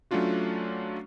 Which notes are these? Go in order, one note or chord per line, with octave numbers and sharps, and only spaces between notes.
F#3 A3 C#4 D4 F4 F#4